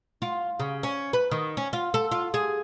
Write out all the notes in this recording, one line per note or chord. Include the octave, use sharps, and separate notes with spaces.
F4
C#3
C#4
B4
D#3
C#4
F4
A4
F4
G#4